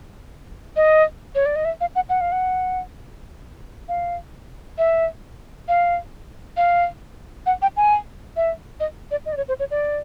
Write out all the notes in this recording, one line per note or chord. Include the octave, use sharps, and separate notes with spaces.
D#5
C#5
D5
D#5
E5
F5
F#5
F#5
F5
F#5
F5
E5
F5
F5
F#5
G5
G#5
E5
D#5
D5
D#5
D5
C#5
C5
C#5
D5